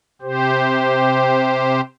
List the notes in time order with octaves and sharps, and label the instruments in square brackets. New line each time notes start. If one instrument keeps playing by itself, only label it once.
[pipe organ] C3 G4 C5